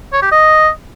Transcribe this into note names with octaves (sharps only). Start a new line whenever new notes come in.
C#5
G4
D#5